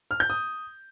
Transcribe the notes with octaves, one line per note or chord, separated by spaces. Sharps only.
F6
G6
D#6